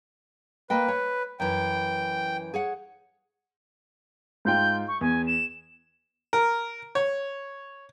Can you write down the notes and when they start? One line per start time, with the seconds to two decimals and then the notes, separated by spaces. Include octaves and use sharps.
0.70 A#3 B4 D#5 G5
0.88 C#5
1.40 F#2 E3 G5
2.54 G#4 C#5 F#5
4.45 G#2 F4 G5 G6
4.87 C#6
5.01 E2 G#5
5.26 E7
6.33 A#4
6.95 C#5